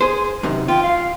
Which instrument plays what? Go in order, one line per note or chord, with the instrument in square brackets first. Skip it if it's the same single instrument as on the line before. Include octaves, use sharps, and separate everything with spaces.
[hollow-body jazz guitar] G#4 C5
F#2 C3 D#3
[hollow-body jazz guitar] F4 [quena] G5
[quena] F5